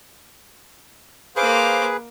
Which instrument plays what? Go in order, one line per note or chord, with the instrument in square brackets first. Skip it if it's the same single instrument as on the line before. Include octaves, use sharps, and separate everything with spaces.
[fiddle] A#3 D6 [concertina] G#4 B4 [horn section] C5 F5